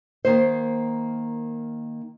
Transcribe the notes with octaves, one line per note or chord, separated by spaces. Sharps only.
D#3 A#3 C5